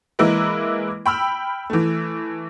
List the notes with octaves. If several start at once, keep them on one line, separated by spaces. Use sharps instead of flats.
E3 G#3 A#3 E4 A#4 B4
G5 B5 E6 F6
E3 A3